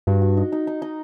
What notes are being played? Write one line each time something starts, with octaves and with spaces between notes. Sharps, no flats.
G2 F#4
F#4
D#4
D#4
D#4
D#4